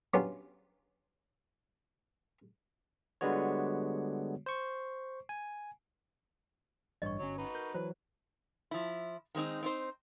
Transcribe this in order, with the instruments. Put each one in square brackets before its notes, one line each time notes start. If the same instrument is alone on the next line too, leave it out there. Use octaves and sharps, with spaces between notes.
[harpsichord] F#3 B3 C#4 D4 F4 G4
[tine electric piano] D3 G3 G#3 B3 F#4 C#5
C5 C#6
G#5
[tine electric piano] A1 G2 C#5 [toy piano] D#5 C#6
[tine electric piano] G1 C#4 [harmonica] F#3 C#5
[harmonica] D#4 F#4 B4
[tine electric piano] A#4 G6
[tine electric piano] E3 F#3 [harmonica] B4 [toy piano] C5
[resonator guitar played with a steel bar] F3 E4
D#3 G#3 C4 D#4
C4 D#4 C5